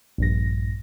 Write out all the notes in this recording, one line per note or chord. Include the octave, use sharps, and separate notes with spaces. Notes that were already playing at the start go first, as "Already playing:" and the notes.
A#1 G2 A#6